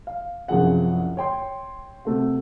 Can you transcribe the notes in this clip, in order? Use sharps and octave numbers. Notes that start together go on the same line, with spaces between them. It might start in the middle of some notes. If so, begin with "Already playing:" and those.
F5
C2 F#2 F3 G#4 F#5
C#5 G5 C6
C3 A3 F#4